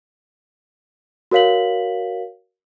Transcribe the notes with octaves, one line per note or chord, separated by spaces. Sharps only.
F#4 A#4 C#5 F5 B6 F#7